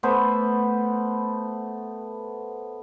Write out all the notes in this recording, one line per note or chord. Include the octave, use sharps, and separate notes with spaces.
A3 B3 B4 C5